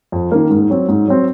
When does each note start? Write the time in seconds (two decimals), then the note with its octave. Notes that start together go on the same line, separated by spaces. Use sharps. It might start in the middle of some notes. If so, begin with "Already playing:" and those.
0.12 F2
0.31 D#3 A#3
0.51 G#2
0.70 F#3 C4
0.88 G#2
1.08 F#3 C4